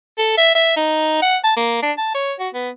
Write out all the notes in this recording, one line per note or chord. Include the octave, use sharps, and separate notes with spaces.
A4
E5
E5
D#4
F#5
A5
A#3
D4
A5
C#5
F#4
B3